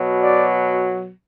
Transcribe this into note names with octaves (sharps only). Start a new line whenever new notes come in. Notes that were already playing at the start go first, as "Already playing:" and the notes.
Already playing: B2 F#3
D5